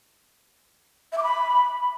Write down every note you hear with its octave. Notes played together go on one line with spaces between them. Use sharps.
E5
D6
B5